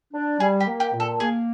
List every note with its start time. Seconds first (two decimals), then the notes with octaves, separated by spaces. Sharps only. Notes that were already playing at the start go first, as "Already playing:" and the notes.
0.14 D4
0.40 G3 G#4
0.60 G4
0.67 A#3
0.80 G4
0.94 A#2
1.00 A4
1.20 A#3 G#4